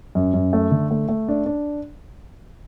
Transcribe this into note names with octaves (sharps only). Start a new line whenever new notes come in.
F#2
F#2
A3
D3
A3
A3
D4
D4